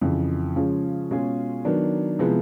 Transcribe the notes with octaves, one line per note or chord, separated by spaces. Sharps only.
F2 C#3 E3
C#3 F3 G#3 C#4
B2 G#3 C#4 F4 G#4
D#3 F#3 B3 D4
C3 F3 G#3 B3 E4